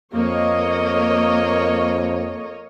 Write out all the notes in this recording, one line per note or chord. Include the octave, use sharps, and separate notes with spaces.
F2 A#3 C#5 D#5